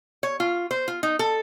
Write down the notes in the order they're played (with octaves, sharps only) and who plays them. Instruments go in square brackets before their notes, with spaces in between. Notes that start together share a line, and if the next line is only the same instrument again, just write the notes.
[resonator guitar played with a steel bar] C#5
F4
C5
F4
D#4
A4